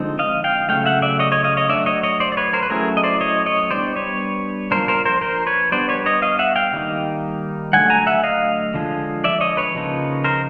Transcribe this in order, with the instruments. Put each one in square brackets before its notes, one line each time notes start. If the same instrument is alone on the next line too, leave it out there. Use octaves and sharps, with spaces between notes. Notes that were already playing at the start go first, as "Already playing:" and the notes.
Already playing: [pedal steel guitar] D3 F3 G#3 C4 D#4
D#5 F5
F5 G5
C#3 F#3 A3 F5 G5
E5 F#5
D5 E5
C#5 D#5
C#5 D#5
D#5 F5
C#5 D#5
F#3 A3 D4 D5 E5
C#5 D#5
C#5 D#5
C5 D5
D5
B4 C#5
A#4 C5
B4
F#3 A3 C#4 E4 G#4 A#4
D#5
C5 D5
C#5 D#5
C#5 D#5
G3 B3 D4 C5 D5
B4 C#5
F3 A#3 D4 A#4 C5
A#4 C5
A#4 C5
A#4 C5
B4 C#5
G3 B3 D4 C5 D5
B4 C#5
C#5 D#5
D#5 F5
E5 F#5
F5 G5
D#3 G3 A#3 D#4
D3 F#3 A3 F#5 G#5
G#5 A#5
E5 F#5
D#5 F5
D3 F3 G#3
D5 E5
C#5 D#5
B4 C#5
C#3 F3 A#3 D#4
A#4 C5